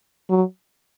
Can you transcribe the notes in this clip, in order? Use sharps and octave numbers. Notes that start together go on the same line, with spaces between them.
F#3